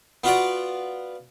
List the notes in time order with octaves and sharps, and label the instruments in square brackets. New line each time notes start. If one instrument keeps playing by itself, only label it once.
[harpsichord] B3 F4 F#4 D5